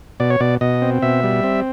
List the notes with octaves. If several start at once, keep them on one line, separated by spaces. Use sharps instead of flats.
B2 D5
C#5
B2 D5
B2 D#5
C4
B2 E5
G3
C4